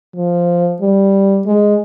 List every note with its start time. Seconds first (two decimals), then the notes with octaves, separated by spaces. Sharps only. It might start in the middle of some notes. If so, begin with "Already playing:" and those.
0.16 F3
0.81 G3
1.46 G#3